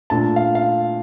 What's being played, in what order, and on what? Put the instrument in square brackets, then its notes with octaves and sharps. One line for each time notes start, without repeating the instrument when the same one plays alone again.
[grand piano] A#2 A3 D4 A5
F5
F5